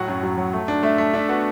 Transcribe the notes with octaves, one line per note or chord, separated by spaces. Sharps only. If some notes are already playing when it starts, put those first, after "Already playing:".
Already playing: A2 F#3 F#4 F#5
F#2
F#2
F#3
A3
D4
A3 E5
A3
D4 E5
B3 F#4 F#5